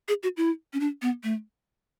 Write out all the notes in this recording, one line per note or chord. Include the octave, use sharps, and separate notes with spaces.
G#4
F#4
E4
C#4
D4
B3
A3